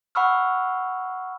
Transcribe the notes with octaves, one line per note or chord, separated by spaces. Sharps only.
F#5 B5 C#6 E6 F6